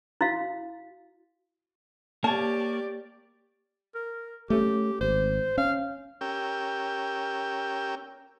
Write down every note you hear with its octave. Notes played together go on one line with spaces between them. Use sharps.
E4 F#4 F5
A#3 G4 C#5 D5 A5
A#4
A3 C#4 G4
G#1 C5
C#4 F5
C#4 G4 A#4 G5 E6